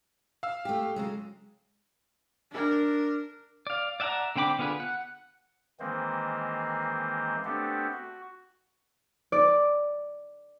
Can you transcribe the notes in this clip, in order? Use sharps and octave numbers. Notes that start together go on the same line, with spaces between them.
F5 E6
A3 G4
C#3 F#3 G#3
D4 A#4
D5 F5
D5 E5 F#5 A5 A#5
D3 C4 G5 B5 D6
D3 B3 F4 G#4 B4
F#5
D#3 E3 G#3 A#3 C4 C5
A3 B3 C4 D4 G4 A4
F#4
D5